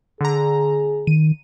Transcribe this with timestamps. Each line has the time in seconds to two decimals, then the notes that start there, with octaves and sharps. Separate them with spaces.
0.21 D3 G#4 A#5
1.07 D#3 D#7